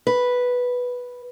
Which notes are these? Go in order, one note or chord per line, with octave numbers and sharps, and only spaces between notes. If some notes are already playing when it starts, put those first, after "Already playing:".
B4